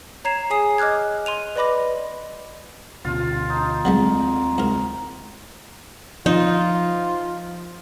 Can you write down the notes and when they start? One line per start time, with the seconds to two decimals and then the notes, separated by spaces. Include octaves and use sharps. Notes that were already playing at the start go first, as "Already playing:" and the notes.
0.25 C#5 A#5 G#6 C7 E7
0.50 G#4 C#5 G#5 D#6 C7
0.78 D#5 D6 F6 F#6 G#6
1.26 C6 D#7 F7
1.56 B4 D5 D#5 B5 D6 A#6
3.05 D2 B2 D3 F4
3.50 D#4
3.85 D#2 F#3 G#3 A3 C4
4.58 G#2 A#4
6.26 F3 D#4 F4